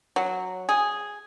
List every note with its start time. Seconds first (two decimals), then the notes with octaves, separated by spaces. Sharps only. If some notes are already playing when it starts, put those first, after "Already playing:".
0.16 F#3
0.69 G#4